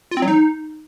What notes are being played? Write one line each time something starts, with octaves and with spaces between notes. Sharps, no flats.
F4
C4
F#3
D#4